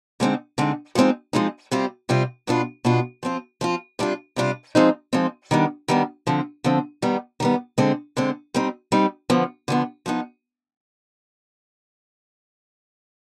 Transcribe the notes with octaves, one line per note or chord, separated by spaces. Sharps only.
D3 G#3 C4 D#4
D3 G#3 C4 D#4
F3 G#3 C4 D#4
F3 G#3 C4 D#4
C3 G3 C4 F4
C3 G3 C4 F4
B2 B3 D4 F4
B2 B3 D4 F4
F3 C4 F4
F3 C4 F4
C3 G3 D4 F4
C3 G3 D4 F4
F3 G#3 C4 D#4
F3 G#3 C4 D#4
D#3 G3 B3 D4
D#3 G3 B3 D4
D3 F3 C4
D3 F3 C4
D#3 G3 B3
D#3 G3 B3
D3 G#3 C4
D3 G#3 C4
G3 C4 D#4
G3 C4 D#4
D3 F3 B3
D3 F3 B3
F3 B3 D#4